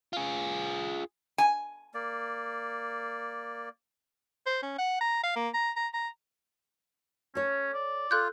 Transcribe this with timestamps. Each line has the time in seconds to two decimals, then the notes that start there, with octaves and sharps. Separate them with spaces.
0.13 F4 G#4
1.38 G#5
1.94 A#3 D5
4.46 C5
4.63 C#4
4.79 F#5
5.01 A#5
5.24 F5
5.36 A#3
5.54 A#5
5.76 A#5
5.94 A#5
7.35 C#4 A4 C#5
7.74 D5
8.11 F4 A4 F#6 G6